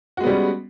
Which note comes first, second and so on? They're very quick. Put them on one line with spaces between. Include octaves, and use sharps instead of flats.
F#4 G#3 B3 G3 C#4